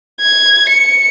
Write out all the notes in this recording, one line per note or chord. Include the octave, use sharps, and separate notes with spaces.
G#6
C#7